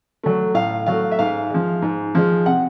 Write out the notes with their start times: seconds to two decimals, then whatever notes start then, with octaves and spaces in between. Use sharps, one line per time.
0.24 F#3 A3
0.54 A2 F5
0.86 F#3 A3 F5
1.12 E5
1.19 G#2 F5
1.50 F3 G#3
1.82 G#2
2.15 F3 G#3
2.46 C3 F#5